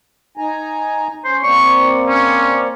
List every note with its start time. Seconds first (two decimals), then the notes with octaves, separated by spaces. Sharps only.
0.37 D#4 G#5 A#5
1.25 C#4 C5
1.43 A#3 C4 D5 C#6
2.08 C#4